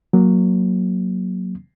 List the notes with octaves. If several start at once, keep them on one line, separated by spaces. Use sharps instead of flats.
F#3 A#3